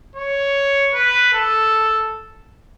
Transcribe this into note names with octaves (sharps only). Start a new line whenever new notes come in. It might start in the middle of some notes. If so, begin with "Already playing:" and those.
C#5
B4
A4